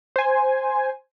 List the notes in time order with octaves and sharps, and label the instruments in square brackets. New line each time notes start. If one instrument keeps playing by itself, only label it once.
[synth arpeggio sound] C5 G#5